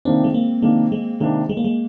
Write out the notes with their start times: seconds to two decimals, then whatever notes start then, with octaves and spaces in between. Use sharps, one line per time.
0.05 C3 D#3 A#3 C4 D4
0.24 G#3
0.34 A#3
0.62 C3 D#3 G#3 A#3 D4
0.92 G#3
1.20 C3 D#3 G#3 A#3 D4
1.49 G#3
1.57 A#3
1.65 G#3